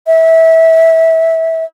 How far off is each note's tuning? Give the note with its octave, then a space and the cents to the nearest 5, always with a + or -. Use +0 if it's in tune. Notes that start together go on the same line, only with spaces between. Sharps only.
E5 -20